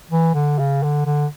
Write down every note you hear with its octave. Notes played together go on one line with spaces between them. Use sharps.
E3
D3
C#3
D3
D3